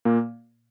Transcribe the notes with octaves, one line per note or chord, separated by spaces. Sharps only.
A#2 A#3